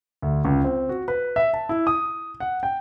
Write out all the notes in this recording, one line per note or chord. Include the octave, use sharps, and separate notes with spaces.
D2
C#2
C4
F#4
B4
E5
A5
E4
D#6
F#5
G5